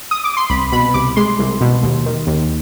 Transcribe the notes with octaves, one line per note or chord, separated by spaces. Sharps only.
D#6
D6
C6
C2 B5
B2 B5
C2 D6
G#3 C6
C2
B2
D#2
D#3
D#2